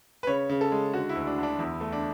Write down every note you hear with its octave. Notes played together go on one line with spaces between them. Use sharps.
B4
C#3 C#5
C#3
A4
G#3
D3 F#4
E4
D2
D4
D3 D4
E2 E4
A3
D4